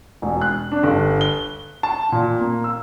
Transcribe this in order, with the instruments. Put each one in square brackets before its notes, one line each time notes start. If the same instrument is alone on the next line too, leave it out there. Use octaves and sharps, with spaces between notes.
[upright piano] E1
F#6
D4
G1
G7
A5
A#2
A#3
E6